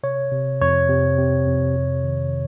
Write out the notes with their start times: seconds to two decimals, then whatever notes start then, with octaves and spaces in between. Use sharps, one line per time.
0.03 C3 C#5
0.32 C3
0.61 F2 C#5
0.89 C3
1.18 C3
1.47 F2
1.76 C3
2.04 D#3